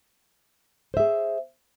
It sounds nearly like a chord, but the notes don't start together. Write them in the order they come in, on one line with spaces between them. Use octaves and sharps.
C5 E5 G#4